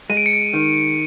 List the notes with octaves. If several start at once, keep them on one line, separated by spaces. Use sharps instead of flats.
G#3 D#7
D7
C#7
D7
D#3